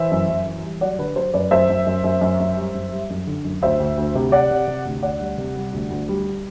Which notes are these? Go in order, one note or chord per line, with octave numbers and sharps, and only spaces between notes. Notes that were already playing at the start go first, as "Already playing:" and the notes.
Already playing: E3 C5 E5
F#2
F#2
E3
G3
F#3 D5 F#5
D3 B4
F#3 C5
F#2 B4 D5
F#2 C5 E5
F#2
F#2
F#2
F#2
F#2
G3
F#2
G3
F#2
D3
F#2
D2 C5 E5
D2
D2
C3
C3 D5 F#5
C3
C3
D2
D2 D5 F#5
G3
C3
G3
D2
D2
G3